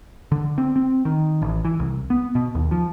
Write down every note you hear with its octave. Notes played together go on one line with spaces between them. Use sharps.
D3
C4
C4
D#3
A1
E3
C2
B3
B2
D#2
F3